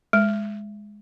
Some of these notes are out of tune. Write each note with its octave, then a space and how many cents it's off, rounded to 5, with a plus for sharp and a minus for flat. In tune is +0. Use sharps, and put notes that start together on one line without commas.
G#3 +0